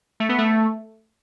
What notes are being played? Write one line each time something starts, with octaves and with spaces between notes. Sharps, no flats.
A3
B3
A3